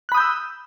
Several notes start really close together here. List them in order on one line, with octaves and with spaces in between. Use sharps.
F#6 B5 D#6 G6 E6